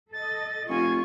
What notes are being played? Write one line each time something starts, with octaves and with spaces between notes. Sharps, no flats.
A4 D#5 A6
F1 F4 G#5 C#6